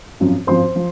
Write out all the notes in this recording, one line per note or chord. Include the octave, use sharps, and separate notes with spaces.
G#1 F#2 F3
G#1 F#2 F3 C5 C6
F3